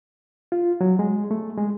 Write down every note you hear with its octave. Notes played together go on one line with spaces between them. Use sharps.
F4
F#3
G#3
A3
G#3